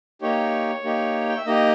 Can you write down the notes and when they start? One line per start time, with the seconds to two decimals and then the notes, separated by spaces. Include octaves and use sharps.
0.22 A#3 D#4 G4 C#5
0.84 A#3 D#4 G4
1.29 G5
1.37 E5
1.46 A#3 D#4 G4 D#5